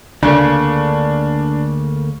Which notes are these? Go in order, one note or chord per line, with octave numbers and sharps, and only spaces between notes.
D2 C#3 A3 A#3 D4